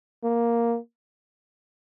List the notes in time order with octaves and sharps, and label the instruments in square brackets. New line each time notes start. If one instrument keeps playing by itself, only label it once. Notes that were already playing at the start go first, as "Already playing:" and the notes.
[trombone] A#3